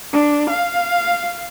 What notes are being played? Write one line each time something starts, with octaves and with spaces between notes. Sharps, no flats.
D4
F5